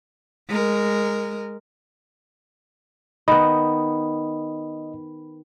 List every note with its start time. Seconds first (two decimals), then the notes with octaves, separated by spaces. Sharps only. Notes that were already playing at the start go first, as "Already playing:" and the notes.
0.49 G#3 A#4
3.28 D#3 B3 D#5 B5